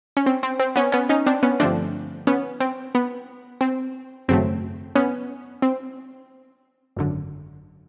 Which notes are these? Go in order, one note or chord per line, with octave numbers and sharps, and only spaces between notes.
C#4
C4
C4
C4
B3 C#4
B3 C#4
C#4 D#4
C4 D4
B3 C#4
G2 D3 F3 A3 C4 D4
B3 C#4
C4
B3
C4
G#1 F#2 C#3 F#3 A3 C4
B3 C#4
C4
G#1 F#2 D3